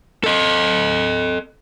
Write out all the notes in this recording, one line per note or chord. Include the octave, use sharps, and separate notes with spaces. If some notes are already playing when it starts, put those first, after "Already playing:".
A4 D#5